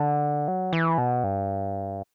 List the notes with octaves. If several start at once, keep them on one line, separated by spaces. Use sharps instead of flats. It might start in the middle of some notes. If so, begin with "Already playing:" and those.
Already playing: D3
F#3
E3
B2
G2